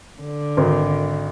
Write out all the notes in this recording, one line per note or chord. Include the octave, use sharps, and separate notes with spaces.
D3
G#1 A#4